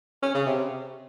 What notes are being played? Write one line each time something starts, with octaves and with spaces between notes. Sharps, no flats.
C#4
C#3
C3